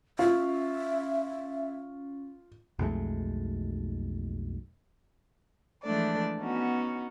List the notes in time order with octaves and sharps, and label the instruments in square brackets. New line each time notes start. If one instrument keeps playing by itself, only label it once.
[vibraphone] C#4 [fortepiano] F4 [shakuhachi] E5
[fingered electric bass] B1 F2 G#3 A3
[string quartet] E3 F3 G#3 A3 D4 D5
B3 C#4 D#4 F#4